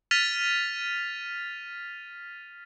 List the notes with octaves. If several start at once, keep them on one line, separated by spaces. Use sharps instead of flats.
F6 A6 B6 D#7 F7